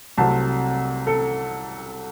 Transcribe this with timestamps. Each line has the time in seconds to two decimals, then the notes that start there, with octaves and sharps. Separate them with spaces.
0.18 C2 C3 F#3 A3 A5
1.07 A4